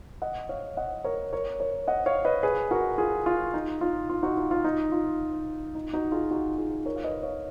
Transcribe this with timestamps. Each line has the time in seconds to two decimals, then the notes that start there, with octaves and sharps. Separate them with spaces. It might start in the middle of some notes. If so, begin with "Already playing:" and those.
0.22 D#5 F#5
0.49 C#5 F5
0.77 D#5 F#5
1.04 A#4 C#5
1.33 A#4 C#5
1.60 A#4 C#5
1.88 D#5 F#5
2.06 C#5 F5
2.25 B4 D#5
2.43 G#4 B4
2.71 F#4 A#4
2.98 F4 G#4
3.26 F4
3.54 D#4
3.81 F4
4.09 F4
4.23 D#4 F#4
4.37 F4
4.51 F4
4.64 D#4
4.92 F4
5.75 D#4
5.93 D#4 F#4
6.12 F4 G#4
6.31 D#4 F#4
6.58 F4 G#4
6.86 A#4 C#5
6.96 F5
7.04 B4 D#5
7.23 C#5 F5